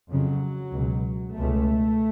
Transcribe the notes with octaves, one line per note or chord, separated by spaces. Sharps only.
F2 C#3 F#3
C#2 B2
C#2 B2 A3